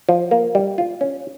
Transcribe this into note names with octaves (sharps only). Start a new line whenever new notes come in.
F3
A#3
G3
F4
C#4